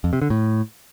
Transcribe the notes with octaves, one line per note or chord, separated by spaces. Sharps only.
F2
C3
D3
A2